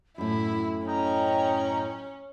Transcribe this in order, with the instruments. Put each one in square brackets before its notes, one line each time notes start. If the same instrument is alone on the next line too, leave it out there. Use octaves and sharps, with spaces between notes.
[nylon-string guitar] F#2 A2 [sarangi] E4 [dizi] B5
[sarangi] C#4 [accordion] D#5 G5 [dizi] A#5